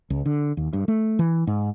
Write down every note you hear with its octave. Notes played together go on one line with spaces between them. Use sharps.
C#2
D3
D#2
G2
A3
E3
G#2